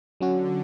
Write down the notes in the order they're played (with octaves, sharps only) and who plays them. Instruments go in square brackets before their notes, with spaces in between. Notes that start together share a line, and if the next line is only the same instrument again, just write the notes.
[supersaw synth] D3 [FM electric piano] F#3 C#4 F#4